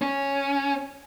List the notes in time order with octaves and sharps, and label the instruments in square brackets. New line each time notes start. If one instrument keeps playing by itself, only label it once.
[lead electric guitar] C#4